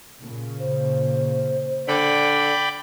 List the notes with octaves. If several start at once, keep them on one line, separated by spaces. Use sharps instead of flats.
A#2 C#3
C5
D3 D5 G5 B5